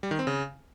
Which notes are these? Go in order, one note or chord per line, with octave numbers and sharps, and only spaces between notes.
G3
D#3
C4
C#3